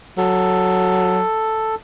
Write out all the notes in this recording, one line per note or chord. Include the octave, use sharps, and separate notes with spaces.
F#3 A4